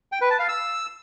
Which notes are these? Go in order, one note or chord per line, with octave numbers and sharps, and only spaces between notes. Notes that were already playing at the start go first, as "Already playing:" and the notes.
G5
B4
A5
F5
E6